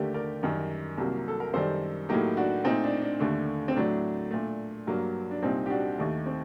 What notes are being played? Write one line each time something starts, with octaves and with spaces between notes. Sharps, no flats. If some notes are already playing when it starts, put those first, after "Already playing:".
Already playing: D#2 D3 A3 G4 A#4
A#4 D5
F#2 D#3 G3
C2 C3 F#3 A#3
A4
A#4
F#2 D#3 G3 A4 C5
A2 F#3 A#3 D#4 G4
D4 F#4
A#2 A3 C4 D#4
D4
D4
D#2 D3 A3
C4
A2 F#3 A3 D4
A#2 A3
G2 F#3 A#3
D4
C2 A#2 G3 C4 D#4
G4
D4 F#4
D#2 D#3 A3
C4